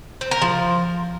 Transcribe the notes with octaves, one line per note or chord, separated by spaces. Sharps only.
C4
A#4
F3